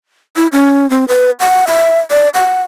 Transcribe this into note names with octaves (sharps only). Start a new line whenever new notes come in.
E4
C#4
C4
B4
F#5
E5
D5
F#5